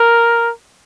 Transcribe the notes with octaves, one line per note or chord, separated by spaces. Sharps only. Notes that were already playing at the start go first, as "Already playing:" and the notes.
Already playing: A#4